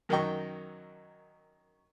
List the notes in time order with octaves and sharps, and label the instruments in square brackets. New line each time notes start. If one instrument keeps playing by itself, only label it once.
[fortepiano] F#2 D#3 F#3 D#5 G5 C#6